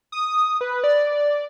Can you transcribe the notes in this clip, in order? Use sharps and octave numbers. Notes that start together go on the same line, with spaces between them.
D#6
B4
D5